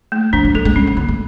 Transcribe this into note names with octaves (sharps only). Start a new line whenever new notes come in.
A3
E3 D4
F#3
G#3 A4
G#3
G#3 C#4
A3
D3 B3
A3